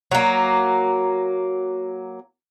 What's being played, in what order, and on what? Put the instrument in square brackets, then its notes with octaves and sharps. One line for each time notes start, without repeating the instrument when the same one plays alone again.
[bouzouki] F#3 A#3